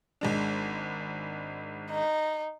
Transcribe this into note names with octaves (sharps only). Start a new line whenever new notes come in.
G#1 G#3 D4
D#4